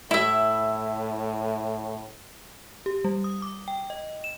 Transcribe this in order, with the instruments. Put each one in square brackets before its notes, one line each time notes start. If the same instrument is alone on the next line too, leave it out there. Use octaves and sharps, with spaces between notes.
[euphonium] A2 [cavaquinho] E4 E5
[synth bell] G4
G3
D#6
D6
G5
D#5
E7